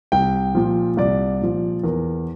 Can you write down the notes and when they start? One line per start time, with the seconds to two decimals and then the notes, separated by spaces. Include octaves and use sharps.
0.12 C2 G5
0.55 A#2 F3
0.97 C2 D5
1.41 A#2 F3
1.84 E2 A#4